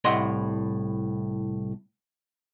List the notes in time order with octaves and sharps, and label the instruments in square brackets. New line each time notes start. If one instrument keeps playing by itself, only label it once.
[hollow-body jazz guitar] C2 A2 D#5 E5 F#5 C6